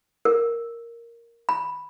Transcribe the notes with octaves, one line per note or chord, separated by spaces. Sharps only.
A#4
B5